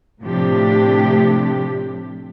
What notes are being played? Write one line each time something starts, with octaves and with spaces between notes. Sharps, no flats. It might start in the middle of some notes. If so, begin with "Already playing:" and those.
A2 C3 F3 A3 D4 G4